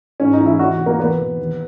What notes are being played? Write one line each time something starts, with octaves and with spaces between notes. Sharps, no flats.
G#2 C#4
D#4
E3
E4
E2 F#4
B2
A#3
E2 B3
B2
D#2